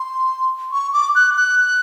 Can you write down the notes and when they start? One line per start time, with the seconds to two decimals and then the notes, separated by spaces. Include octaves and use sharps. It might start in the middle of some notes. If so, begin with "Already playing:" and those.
Already playing: C6
0.73 C#6
0.93 D6
1.15 F#6
1.37 F#6